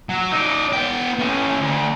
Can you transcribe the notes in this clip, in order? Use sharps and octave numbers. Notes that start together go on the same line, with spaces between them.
F#3
D#4 D5
B3 G5
A3 C#4
D2